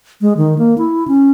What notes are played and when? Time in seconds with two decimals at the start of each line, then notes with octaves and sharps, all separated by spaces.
0.21 G#3
0.37 D#3
0.58 A#3
0.78 E4
1.08 C#4